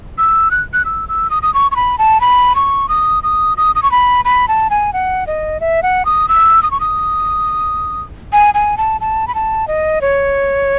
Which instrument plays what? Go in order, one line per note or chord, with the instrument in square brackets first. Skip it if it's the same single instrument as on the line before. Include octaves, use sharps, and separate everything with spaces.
[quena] E6
F#6
F#6
E6
E6
D#6
D#6
C#6
C#6
B5
A5
B5
C#6
D#6
D#6
D#6
D#6
C#6
B5
B5
A5
G#5
F#5
D#5
E5
F#5
D#6
E6
D#6
C#6
D#6
G#5
G#5
A5
A5
B5
A5
D#5
C#5